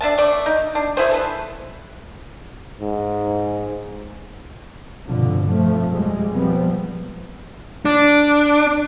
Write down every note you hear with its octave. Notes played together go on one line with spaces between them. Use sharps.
D4 E5 A5
A3 D5
D#4
D4
A3 E4 G#4 C5
A4 B4
G#2
F1 G2 B2 D3 F3
F2 F3 A3
F3 G3 G#3
B2 F3 G3 B3 C4
D4